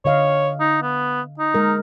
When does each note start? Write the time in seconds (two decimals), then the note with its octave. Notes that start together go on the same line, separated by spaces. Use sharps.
0.05 D3 C#5 D#5 F5
0.60 D#4
0.83 B3
1.39 D#4
1.54 G#3 A#4